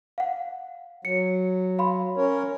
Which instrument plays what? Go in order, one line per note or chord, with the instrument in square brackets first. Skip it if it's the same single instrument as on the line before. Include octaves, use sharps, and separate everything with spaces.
[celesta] F5 F#5
[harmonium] F#3 [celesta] C#7
[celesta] F5 B5 C6
[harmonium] C#4 A#4 C#5